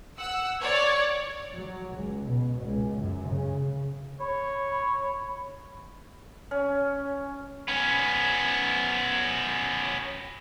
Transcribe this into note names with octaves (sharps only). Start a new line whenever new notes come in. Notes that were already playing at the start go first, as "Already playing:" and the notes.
F#5 E6
C#5 D5
F#3
C#2
B2
C#2
F#2
C#3
C#5 B5
C#4
B3 C#4